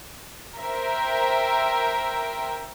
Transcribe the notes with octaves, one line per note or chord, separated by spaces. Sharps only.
A#4 C5 E5 G5